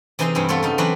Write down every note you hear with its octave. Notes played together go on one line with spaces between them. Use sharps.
C3 E3 D#4 G#4 D#5 C6
G2 C4 E4
B3 C4 F4 A4 C#5
C#3 D#4
E3 F#3 C4 D4 F#4 B4